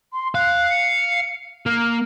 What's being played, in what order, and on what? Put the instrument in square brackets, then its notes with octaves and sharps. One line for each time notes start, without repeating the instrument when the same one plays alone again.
[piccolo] C6
[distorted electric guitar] F5 [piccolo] F#6
[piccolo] C#7
[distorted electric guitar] A#3 [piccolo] F6